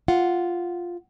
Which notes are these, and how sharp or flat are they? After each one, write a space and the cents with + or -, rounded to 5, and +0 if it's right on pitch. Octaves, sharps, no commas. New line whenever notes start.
F4 +0 F#5 +0